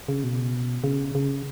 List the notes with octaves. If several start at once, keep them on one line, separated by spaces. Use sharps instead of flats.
C#3
B2
C#3
C#3